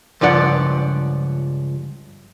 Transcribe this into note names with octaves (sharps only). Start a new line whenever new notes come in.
C#2 G2 F3 D5 F#5